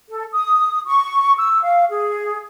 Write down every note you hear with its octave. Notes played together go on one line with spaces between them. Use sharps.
A4
D#6
C#6
E6
F5
G#4